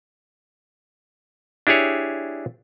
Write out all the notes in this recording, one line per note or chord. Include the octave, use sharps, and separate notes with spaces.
D4 E4 G4 G#4 C#5